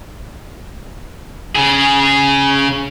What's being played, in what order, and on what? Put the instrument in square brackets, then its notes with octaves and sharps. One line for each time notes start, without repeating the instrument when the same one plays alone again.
[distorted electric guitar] C#3 G#4